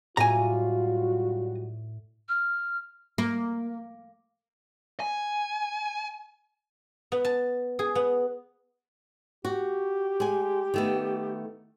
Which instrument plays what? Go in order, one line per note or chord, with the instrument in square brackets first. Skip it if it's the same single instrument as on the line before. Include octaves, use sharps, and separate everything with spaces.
[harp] A2 D6 [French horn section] F#3 G3 F#4 [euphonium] F4 [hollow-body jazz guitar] G#5 A#5
[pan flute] F6
[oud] A#3
[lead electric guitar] G#5
[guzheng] B3
A5
G#4
B3
[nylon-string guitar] F#4 [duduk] G4
[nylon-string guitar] G#3 G#5
D#3 A3 B3